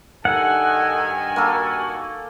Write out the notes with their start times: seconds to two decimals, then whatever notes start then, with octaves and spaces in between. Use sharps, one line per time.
0.25 G2 D#3 A4 F#5 G#5
1.36 A#3 F#4 A4